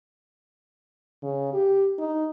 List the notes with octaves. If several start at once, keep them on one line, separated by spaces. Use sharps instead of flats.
C#3
G4
D#4